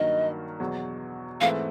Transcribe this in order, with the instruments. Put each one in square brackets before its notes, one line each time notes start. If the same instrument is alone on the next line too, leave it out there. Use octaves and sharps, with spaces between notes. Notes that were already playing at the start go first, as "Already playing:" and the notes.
Already playing: [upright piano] G2 D#3 F#3 A#3 [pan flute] D#5
[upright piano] E2 B2 F#3
[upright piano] G#2 E3 A3 C4 [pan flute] F5